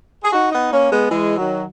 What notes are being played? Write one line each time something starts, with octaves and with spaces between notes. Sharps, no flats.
G#4
D#4 F#4
B3 D#4
A#3 C#4
G#3 B3
E3 G#3
D#3 F#3